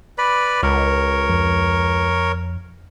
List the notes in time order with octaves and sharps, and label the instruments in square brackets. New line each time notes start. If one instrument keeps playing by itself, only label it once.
[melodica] B4 D5 B5
[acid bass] C#2 [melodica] A#4 C#5
[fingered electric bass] F2